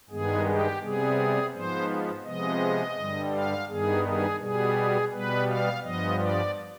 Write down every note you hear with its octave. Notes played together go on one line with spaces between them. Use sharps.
G2 D#3 G#3 B3 G#4
G4
C3 G3 B3 G#4
G#2 F3 B3 C5
C3 F3 G#3 B3 D#5
G2 D3 G3
F5
G2 D#3 B3 G#4
G#4
B2 G3 B3 G#4
B2 G3 B3 B4
F5
G2 F3 B3 D#5
D5